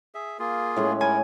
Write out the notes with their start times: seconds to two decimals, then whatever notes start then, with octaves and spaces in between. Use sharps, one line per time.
0.15 G#4 E5
0.39 A#3 F4 G#4
0.76 A2 G#3 C#4
1.01 D#4 E4 A#4 G#5